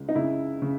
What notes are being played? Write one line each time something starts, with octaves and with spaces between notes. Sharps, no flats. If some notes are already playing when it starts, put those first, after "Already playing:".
Already playing: C#2
D#4
C#3 E4
C#3